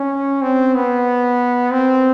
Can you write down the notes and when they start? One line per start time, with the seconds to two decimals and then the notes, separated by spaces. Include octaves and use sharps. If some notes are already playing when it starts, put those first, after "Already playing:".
Already playing: C#4
0.42 C4
0.75 B3
1.71 C4